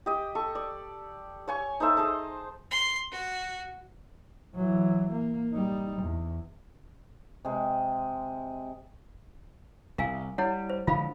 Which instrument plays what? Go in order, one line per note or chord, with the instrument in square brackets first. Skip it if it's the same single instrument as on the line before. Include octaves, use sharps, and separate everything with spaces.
[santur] G4 D#5
A4 C#6
D5
C#5 G#5 C#6
D#4 A4 C5 E5
G#4 C5 D#5 A5
[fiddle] C6
F#4
[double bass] E3 F#3
A#3
G3 D#4
E2
[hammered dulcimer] C3 G#3
[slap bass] C2 [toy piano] A#4 F5 G#5
[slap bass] G3 [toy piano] E4 C#5 F#5
[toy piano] C5
[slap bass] D3 F3 G#3 [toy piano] F4 F5 B5